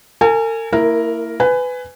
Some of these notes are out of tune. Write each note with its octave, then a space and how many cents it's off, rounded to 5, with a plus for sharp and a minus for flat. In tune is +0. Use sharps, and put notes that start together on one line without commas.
A#4 -45 G#5 +0
A#3 -30 E4 +0 A#4 +0
B4 +20 G#5 +0